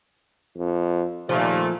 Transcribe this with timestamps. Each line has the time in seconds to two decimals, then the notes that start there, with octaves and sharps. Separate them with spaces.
0.57 F2
1.29 D#2 A#2 F3 A3